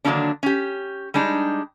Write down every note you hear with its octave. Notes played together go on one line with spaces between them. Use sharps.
D3 D#3 F#3 A#3 C#4 D4
C#4 G4
G3 G#3 D4 D#4 G4